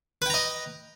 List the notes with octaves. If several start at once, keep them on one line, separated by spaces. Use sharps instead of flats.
B4 D#5 G5 A#5